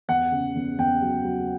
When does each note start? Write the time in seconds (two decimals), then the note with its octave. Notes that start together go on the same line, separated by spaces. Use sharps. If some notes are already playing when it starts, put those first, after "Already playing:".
0.08 E2 F#5
0.32 C#3
0.55 E2
0.78 E2 G5
1.01 F#3
1.24 F#3